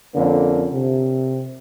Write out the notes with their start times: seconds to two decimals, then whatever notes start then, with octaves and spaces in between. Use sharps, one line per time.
0.15 F2 D3 A#3 C#4
0.74 C3